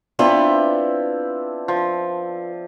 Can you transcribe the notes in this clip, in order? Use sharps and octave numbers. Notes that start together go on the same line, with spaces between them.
B3 C4 D4 E4 F4 B4
F3